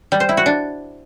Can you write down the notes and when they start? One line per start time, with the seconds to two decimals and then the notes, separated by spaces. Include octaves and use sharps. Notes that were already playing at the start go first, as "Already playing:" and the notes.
0.12 G3
0.20 C5
0.29 E4
0.37 F#4
0.46 D4